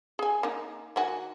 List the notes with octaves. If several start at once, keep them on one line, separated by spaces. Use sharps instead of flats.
G#4 G#5
A#3 D#4
D#3 F#4 G#5